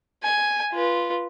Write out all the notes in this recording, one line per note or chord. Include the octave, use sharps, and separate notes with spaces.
G#5
F4 B4